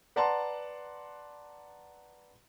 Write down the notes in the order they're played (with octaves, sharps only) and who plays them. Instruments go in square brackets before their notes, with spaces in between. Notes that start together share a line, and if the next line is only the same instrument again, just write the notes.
[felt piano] B4 D5 F#5 A5 A#5 C6